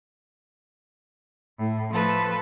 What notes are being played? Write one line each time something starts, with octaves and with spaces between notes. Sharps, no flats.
A2
F3 A3 A4 B4